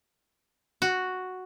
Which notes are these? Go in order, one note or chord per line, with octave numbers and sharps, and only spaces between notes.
F#4